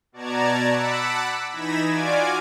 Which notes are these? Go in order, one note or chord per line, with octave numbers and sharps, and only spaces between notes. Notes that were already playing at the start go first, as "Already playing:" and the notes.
B2 F#4 D5 A5 A#5 G#6
F#5 A5 B5 D6 E6 F#6
E3 D#4 B5 G#6 A#6 E7
F4 F#4 D5 G#5 D6 G#6